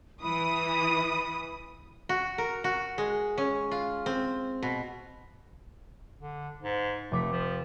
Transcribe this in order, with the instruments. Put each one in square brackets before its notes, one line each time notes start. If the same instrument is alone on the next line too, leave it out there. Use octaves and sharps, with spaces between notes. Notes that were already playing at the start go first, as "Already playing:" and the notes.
[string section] E3 D#6 [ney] B5
[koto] F#4
A#4
F#4
G#3
C#4
F4
C4
B2
[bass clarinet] D3
G#2
[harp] F1 D6 B6 [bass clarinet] A3
[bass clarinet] F3